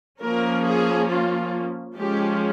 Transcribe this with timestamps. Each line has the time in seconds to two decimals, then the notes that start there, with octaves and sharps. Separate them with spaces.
0.21 F3 A#3 C#4 A#4
0.65 G#4
1.09 F4
1.97 F3 G#3 C#4 G4